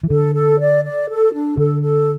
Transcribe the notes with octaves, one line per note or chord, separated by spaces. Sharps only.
E3
D3 A4
A4
D5
D5
A4
D4
D3 A4
A4